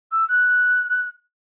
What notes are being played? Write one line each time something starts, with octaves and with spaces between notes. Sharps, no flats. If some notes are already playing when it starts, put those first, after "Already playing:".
E6
F#6